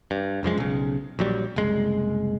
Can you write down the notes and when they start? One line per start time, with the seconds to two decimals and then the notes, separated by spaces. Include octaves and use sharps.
0.11 G2
0.43 F1 F#2 F3 G#3
0.57 B1 C#3
1.19 A#1 F#3 G3
1.56 F#1 C2 G#3